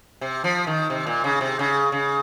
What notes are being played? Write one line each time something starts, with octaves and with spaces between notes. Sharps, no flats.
C3
F3
D#3
C3
A#2
C#3
C3
C#3
C#3